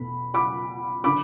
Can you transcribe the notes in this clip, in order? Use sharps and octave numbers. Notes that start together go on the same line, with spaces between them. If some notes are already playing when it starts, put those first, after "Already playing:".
Already playing: E2 B2 A3 B5
B5 D6
D3 B5 D6